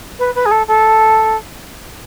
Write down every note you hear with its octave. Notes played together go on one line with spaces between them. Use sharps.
B4
B4
G#4
A4
A4